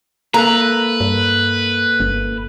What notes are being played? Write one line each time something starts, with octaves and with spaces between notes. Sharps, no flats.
A#3 A4 B4 A#5 F#6
G2
G1